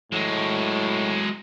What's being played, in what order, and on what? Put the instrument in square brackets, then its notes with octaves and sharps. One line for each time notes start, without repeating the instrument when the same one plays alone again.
[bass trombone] A2 [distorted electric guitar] F#3 G#3